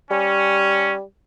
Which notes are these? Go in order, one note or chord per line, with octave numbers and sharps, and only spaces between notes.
G3 C#4